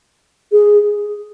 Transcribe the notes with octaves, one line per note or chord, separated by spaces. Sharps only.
G#4